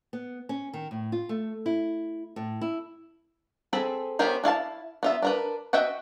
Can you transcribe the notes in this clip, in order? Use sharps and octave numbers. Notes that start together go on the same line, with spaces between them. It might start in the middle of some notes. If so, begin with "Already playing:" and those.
B3
C#4
D#3
A2
F4
A3
E4
A2
E4
C4 G#4 A4 B5
B3 C#4 G4 A#4 C5
D4 E4 F5 A5
B3 F4 E5
D4 A#4 B4
F#4 D#5 E5 F#5 G5